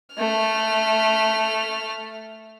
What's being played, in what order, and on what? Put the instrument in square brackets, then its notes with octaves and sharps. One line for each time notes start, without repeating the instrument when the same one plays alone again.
[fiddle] A3 F6